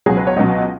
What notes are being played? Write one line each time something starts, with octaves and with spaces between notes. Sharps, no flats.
C#2 B2 F#3 G#4
B4
C#5
C#2 B2 F#3 D#5